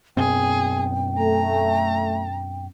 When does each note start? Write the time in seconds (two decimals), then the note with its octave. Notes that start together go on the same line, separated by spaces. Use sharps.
0.17 F#2 B2 C4 G#4 G5
1.17 A3 A#5